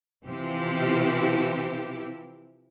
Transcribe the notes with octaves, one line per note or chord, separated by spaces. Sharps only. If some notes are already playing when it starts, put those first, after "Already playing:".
C3 E3 F3 E4 G4